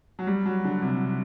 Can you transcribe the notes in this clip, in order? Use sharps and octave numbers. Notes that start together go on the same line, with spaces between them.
F#3
G3
F#3
D3
C3